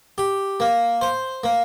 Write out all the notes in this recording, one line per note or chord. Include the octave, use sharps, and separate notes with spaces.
G4
A#3
C5
A#3